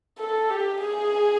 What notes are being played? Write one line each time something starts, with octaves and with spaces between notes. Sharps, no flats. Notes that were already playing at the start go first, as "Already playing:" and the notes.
A4
G4
G#4